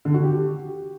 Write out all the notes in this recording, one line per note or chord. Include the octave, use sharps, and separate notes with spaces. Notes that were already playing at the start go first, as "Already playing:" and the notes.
D3
F#4
G4